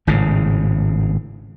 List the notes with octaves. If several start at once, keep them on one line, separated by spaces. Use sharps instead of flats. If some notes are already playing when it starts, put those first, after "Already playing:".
G#1 A2 C#3